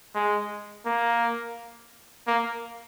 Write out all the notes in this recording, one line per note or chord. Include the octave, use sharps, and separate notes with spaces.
G#3
A#3
A#3